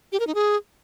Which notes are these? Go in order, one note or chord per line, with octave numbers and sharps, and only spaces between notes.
G4
A#4
D#4
G#4